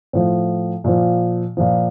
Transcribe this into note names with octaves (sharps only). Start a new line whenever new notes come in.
A2 F3
A#2 F3
A#2 F3